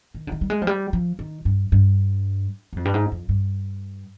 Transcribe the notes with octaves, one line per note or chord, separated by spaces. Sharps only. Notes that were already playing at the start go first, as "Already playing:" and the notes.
D#3
D3
D#3
G3
G#3
F3
G3
F3
D#3
G2
G2
G2
F2
G2
G#2
F2
G2